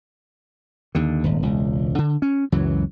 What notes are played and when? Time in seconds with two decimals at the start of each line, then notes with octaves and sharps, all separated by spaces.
0.95 D#2 D3
1.24 D#1 G#1
1.42 E1 C#2
1.98 D3
2.22 C#4
2.52 C#2 F#2 E3 F#3